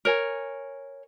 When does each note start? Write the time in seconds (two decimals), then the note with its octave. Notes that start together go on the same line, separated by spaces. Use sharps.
0.05 A#4 C#5 G#5